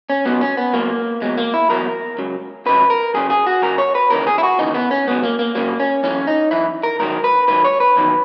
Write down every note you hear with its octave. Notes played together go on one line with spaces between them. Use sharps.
C#4
C#2 B2 F#3 B3
C#4
B3
C#2 B2 F#3 A#3
E2 B2 F#3 G#3
A#3
E4
E2 B2 F#3 A#4
C#2 C#3 F#3
C#2 C#3 F#3 B4
A#4
F#2 C#3 F#3 G#4
G#4
F#4
F#2 C#3 F#3 A#4
C#5
B4
D#2 C#3 E3 A#4
G#4
E4
F#4
D#2 C#3 E3 D#4
B3
C#4
C#2 C#3 F#3 B3
A#3
A#3
C#2 C#3 F#3 A#3
C#4
F#2 E3 C#4
D#4
F#2 E3 E4
A#4
G#2 D#3 F#3 A#4
B4
G#2 D#3 F#3 B4
C#5
B4
E2 D#3 F#3